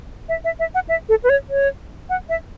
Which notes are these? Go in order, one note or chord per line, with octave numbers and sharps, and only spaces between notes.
E5
E5
E5
F#5
E5
A4
B4
C#5
C#5
F#5
E5